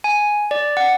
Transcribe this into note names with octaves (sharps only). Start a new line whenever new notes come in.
G#5
D5
F#5